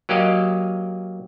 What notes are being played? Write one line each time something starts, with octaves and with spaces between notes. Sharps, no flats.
F#3 A#3 G4 D5 D#5 F5